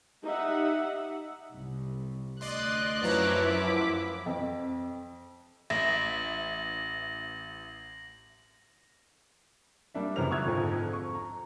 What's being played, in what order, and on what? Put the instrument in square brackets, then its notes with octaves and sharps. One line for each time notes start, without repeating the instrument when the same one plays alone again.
[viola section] D#4 G4 E5 F#5
[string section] C2
[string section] D2 F#6 [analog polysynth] D5 D#5 C6
[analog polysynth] F#2 F3 E4 [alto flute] B4 [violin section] C#5 A#5 D6
[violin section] D6 B6
[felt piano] F2
[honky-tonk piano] A1 [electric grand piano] E5 [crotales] A#6 F#7
[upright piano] G3 A#3 D4 E5
F#2 C#3 E3 C5 F6 F7
C#6 D#6 E6 F#6 G#6
F2 G#2 D3 F3
C#6
A#5